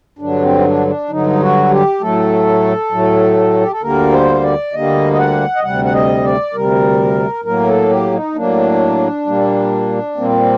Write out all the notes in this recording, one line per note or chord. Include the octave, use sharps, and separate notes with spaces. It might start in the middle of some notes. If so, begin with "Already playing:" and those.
G2 D3 F#3 D4
C4
D#4
D4
D4
G2 D3 F#3 D#4
F#4
G4
A2 F#3 A3 A4
A2 F#3 A3
G4
A4
D2 D3 G3 A#3 A#4
C5
D5
D2 D3 G3 A#3 D#5
D#5
F#5
D#5
D2 C3 G3 F#5
F#5
D#5
D5
D2 C3 G3 A#4
A2 F#3 A#3 A#4
A4
G4
D#4
A2 F#3 A#3 D4
A#2 G3 A#3
A#2 G3 A#3 C4